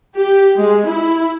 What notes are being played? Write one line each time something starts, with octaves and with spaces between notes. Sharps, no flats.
G4
G#3
E4